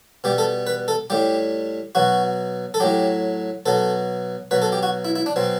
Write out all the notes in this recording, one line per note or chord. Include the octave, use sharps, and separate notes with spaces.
B2 G3 G4
A4
B4
A4
A2 G3 G4
B2 F#3 F#4
A4
A2 F#3 G4
B2 F#3 A4
B2 F#3 B4
A4
G4
F#4
E4
E4
D4
B2 F#3 C4